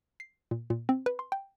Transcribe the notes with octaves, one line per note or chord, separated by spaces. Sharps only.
C7
A#2
A#2
C4
B4
C6
G5